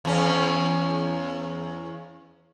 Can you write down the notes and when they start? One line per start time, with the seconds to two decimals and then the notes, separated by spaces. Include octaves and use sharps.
0.05 E2 C#4